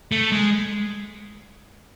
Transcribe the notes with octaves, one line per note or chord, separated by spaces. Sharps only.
A3
G#3